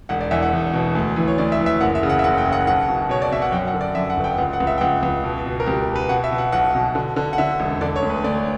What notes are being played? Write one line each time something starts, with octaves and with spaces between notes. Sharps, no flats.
E1 F#5
D5
E2 E5
F#5
E1
B2
D2
E3
C#5
D2 D5
E5
E3
E5
F#1 F#5
E5
C#3
F#5
E5
F#1 F#5
G5
C#3
F#5
B1 F#5
B2
B2 C#5
D5
B2 E5
F#5
F#2 G5
F#5
D3
D5
F#2 E5
F#5
G1
G5
C#2 F#5
F#5
C#2
E5
G5
C#2 F#5
C#2
B2
B2
A#4
C#2 G4
B2
B4
B2 F#5
E5
B2
F#5
B1 F#5
B2
D3
D3
F#5
D3 E5
E1
D3 D5
C#5
D2
B4
D2 D5